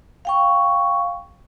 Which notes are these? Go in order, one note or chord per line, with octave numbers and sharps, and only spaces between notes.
F5 G5 C#6